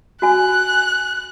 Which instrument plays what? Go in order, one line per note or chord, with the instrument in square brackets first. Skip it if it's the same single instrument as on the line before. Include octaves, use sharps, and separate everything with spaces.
[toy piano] F#4 G#5 [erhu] F#6